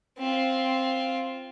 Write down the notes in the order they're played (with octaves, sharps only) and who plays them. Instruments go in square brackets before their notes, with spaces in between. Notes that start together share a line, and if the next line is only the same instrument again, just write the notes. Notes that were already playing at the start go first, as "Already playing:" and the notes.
[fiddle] C4 F4